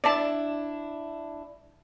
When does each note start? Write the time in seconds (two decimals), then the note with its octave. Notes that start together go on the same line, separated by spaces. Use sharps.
0.04 D4 E4 D5 A5